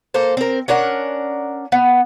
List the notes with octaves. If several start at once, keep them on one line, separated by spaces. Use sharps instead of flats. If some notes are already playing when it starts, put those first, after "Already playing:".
A#3 A4 C5
C4 A#4
C#4 D4 A#4 F#5
B3